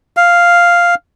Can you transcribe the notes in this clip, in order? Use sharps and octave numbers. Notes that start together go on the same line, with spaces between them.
F5